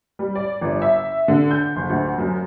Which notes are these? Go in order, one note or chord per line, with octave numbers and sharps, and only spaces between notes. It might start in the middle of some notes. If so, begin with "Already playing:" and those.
G3
D5
G1
E5
D3
G6
F#1
D2
F#2